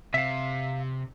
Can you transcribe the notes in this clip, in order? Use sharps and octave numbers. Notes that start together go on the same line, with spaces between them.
C3 E5 F5